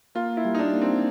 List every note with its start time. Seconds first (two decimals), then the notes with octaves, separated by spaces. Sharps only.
0.15 A#3 F4
0.37 E4
0.45 G3
0.55 D#4
0.59 D4
0.74 A#3
0.81 C4